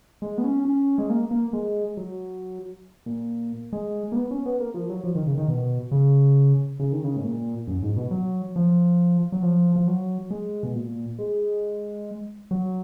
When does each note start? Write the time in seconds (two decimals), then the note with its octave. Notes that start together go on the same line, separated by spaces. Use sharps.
0.22 G#3
0.38 B3
0.44 C#4
0.65 C#4
0.98 G#3
1.10 A#3
1.31 A#3
1.53 G#3
1.97 F#3
3.06 A#2
3.73 G#3
4.12 A#3
4.16 B3
4.31 C#4
4.46 B3
4.60 A#3
4.74 F3
4.90 F#3
5.04 F3
5.15 D#3
5.26 C#3
5.38 D#3
5.48 B2
5.92 C#3
6.79 C#3
6.92 D#3
7.04 C#3
7.17 G#2
7.24 A#2
7.67 F#2
7.83 G#2
7.96 B2
8.11 F#3
8.56 F3
9.32 F#3
9.42 F3
9.76 F3
9.87 F#3
10.30 G#3
10.63 B2
10.75 A#2
11.19 G#3
12.51 F#3